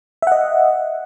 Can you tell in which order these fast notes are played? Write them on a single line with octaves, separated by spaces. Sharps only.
E5 F#5 D#5